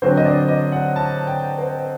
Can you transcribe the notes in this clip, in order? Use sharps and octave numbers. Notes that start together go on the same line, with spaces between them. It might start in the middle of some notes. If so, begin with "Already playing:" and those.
D3 F#3 C4 C5
D#5
D5
D#5
F#5
A5
G5
C5